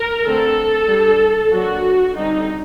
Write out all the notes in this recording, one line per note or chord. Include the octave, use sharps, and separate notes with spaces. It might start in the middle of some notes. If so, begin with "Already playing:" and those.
Already playing: A#4
D3 A3 C4 A4
G3 D4
F#3 A#3 D4 F#4
D3 G3 C4 D#4